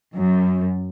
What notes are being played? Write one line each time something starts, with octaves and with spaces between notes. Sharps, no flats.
F#2